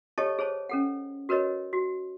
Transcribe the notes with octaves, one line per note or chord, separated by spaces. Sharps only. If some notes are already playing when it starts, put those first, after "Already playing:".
G4 A4 C#5 D#5 A5 C#6
G#4 C5 C#5 A5
C#4 A4 F#5
F#4 A#4 B4 C#5 D#5
F#4